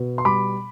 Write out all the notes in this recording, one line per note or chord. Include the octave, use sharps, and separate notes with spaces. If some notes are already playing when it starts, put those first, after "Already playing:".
Already playing: B2
C6
G3 B5 D6